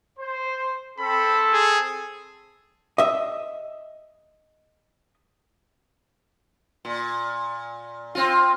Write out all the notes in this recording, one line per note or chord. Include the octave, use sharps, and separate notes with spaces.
C5
C4 A4 B5
G#4
D#5 E5
A#2
C4 F4